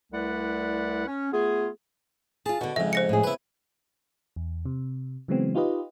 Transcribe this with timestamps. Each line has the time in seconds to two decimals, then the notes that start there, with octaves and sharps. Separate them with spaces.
0.13 C2 A3 E4 B4 D5 F#5
1.07 C#4
1.32 A3 B3 F4 G#4
2.46 F4 G#4 A5
2.61 B2 D3 F#4
2.76 F2 G#2 C#3 E5
2.93 C5 A#6 C#7
3.09 A2 G#4
3.24 C#3 B3 E4 B4
4.36 E2
4.65 C3
5.28 C#3 E3 F#3 G#3 B3 C4
5.55 D#4 F4 G4 B4 D#5